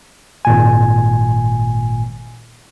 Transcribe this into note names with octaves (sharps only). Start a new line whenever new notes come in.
G#1 A#2 G#5